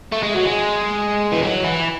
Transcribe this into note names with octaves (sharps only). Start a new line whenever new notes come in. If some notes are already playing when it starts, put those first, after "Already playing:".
A3
G#3
F#3
G#3
E3
F#3
E3